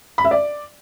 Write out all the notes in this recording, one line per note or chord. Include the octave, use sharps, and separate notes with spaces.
B5
E5
D5